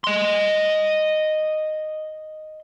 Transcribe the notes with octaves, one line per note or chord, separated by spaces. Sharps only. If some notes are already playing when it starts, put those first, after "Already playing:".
D#5 C6